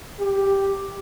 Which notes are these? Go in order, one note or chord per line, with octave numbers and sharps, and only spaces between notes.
G4